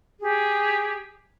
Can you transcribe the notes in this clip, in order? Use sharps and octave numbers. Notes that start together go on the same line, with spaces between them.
G4 G#4